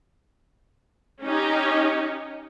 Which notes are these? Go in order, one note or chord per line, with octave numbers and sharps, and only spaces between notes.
C#4 D#4 G4